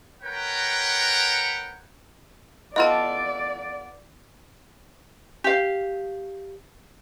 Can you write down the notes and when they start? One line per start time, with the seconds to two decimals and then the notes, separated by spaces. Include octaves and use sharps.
0.23 A#4 B4 C#5 F#5 G5 A#5
2.76 B3 F4 A4 D5 D#5 A5
5.44 G4 F5